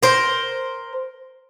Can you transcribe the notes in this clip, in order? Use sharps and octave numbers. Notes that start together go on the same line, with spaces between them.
A#4 C5